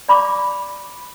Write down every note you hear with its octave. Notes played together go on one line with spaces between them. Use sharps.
D5 B5 C#6 D6